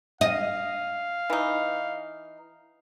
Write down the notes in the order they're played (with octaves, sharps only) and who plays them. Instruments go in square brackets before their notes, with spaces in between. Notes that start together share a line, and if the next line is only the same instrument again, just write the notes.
[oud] D#5 [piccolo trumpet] F5
[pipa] E3 D#4